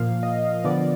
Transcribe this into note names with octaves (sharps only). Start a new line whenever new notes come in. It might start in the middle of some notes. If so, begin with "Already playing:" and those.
Already playing: A#2 F3 A#3 F5
D#5
D3 F3 B3 D5